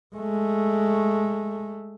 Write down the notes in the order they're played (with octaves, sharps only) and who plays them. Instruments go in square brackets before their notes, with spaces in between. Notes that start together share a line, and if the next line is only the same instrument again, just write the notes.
[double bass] G#3 A3